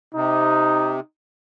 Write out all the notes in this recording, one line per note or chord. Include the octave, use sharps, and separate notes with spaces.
C3 D#4